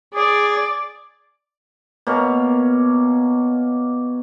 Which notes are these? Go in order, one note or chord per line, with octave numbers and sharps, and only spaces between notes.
G#4 D5
B2 A#3 C#5 F5